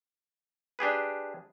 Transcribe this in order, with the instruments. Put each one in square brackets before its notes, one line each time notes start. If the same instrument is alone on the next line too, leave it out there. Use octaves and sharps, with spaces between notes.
[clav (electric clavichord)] D4 G4 G#4 B4